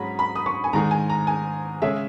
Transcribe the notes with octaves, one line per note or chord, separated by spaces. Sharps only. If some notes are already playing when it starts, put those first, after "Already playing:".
Already playing: G#2 F#3 C#4 G#4 A#5 B5
B5
D#6
C#6
G#5
G#2 D#3 G#3 D#4 G#4 A#5
G#5
A#5
G#5
C#3 G#3 C#4 G#4 E5